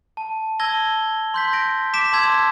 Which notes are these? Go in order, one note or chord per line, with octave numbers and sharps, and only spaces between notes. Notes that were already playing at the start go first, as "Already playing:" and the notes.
A5
A5 E6 G#6 A#6 G7
C6 G6 B6
C6 A#6 D7
D6 B6 D7 E7
A5 C6 E6 G#6